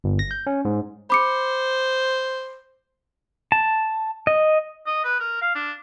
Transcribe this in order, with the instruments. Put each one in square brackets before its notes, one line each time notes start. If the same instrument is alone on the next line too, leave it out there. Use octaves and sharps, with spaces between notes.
[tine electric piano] G1
A#6
G6
C#4
G#2
[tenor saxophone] C5 [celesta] B5 D6 C#7
[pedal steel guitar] A5
D#5
[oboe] D#5
B4
A#4
F5
D4